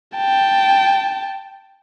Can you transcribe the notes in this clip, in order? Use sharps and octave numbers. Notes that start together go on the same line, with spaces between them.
G5 A5